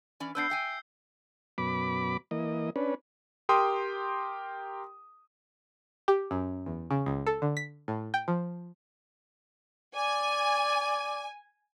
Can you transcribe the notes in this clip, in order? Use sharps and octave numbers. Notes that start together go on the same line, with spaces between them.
E3 C#4 D5
B3 D4 B4 E6 G6 C7
E5 G5 G#5
F#2 B2 B5 D6
E3 A#3 D#5
C#4 D4 B4
G4 A#4 G5 C6 D#6
G4
F#2
E2
C#3
C#2
A4
D3
B6
A2
G5
F3
D5 G#5